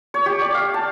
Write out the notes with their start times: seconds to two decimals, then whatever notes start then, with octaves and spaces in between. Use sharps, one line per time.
0.14 C#5
0.26 G4
0.41 D5
0.55 F5
0.74 A5